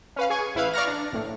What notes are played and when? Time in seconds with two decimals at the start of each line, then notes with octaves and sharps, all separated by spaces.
0.16 C#4 B4 F5
0.30 G#4 G#5 C#6
0.55 A1 E4 B4 F5
0.73 D5 F5 A#5 C#6 F6 A#6
0.87 D4
1.12 A#1 A2